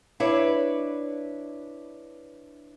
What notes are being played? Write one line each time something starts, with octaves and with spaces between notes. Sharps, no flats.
D4 E4 B4 C#5 D5